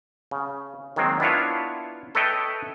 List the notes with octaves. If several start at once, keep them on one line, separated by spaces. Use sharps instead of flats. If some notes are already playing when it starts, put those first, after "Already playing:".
C#3
D#3 F#3 G#3 A#3 C4
B3 D4 E4 F4 C#5
A4 B4 C#5 D#5 E5 G5